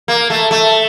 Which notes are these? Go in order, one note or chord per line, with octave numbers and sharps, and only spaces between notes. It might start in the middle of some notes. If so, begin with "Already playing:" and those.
A#3
A3
A3